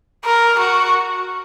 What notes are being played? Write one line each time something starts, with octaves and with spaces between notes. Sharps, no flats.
A#4
F#4